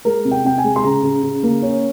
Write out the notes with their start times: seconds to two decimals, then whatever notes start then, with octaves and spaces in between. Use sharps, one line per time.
0.05 G#3 A#4
0.25 C3
0.31 G5
0.44 C3 G5
0.58 G#5
0.64 G#3
0.76 C6
0.84 C#3 A#5
1.03 C#3
1.23 C#3
1.43 A#3
1.62 C#4